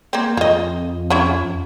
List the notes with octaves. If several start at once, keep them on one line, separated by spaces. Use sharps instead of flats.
A#3 C4
F2 F4 D#5
C#4 E4 F4